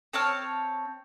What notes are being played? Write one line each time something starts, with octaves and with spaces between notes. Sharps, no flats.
C4 C#5 A5 F6